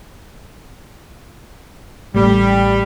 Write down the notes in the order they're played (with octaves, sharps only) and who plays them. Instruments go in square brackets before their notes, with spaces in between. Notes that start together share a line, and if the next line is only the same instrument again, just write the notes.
[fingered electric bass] A1 A3 [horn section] G3